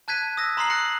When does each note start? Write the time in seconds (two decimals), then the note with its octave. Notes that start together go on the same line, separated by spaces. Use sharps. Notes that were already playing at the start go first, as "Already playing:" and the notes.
0.08 A5 F#6 G#6 B6 D#7
0.37 D#6 E6 A#6
0.57 A#5 C6 D#6 F6 C7 F#7
0.70 F6 F#6 A#6 C#7